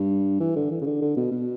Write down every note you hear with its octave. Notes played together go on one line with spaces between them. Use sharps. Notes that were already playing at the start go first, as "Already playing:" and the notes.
Already playing: G2
E3
D3
E3
C#3
D3
D3
B2
B2